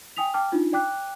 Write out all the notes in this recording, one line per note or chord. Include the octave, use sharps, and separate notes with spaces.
G5 G#5 D#6 B6 F7
G5 A5 D6 F6
D4 D#4 F4
D5 G5 D6 F#6